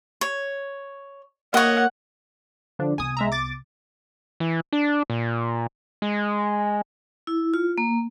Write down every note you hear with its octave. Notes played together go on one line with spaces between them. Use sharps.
C#5
A#3 C#5 D#5 F#5
D3 F3 D4
C2 B3 G#5 D#6
G#3 E5 A#5
D6 A6
E3
D4
A#2
G#3
E4
F4
A#3